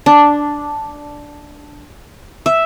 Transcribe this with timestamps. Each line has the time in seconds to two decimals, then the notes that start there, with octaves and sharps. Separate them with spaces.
0.06 D4
2.46 E5